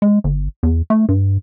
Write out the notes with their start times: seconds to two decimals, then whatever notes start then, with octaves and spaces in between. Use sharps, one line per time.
0.02 G#3
0.24 G1
0.63 E2
0.90 A3
1.09 G2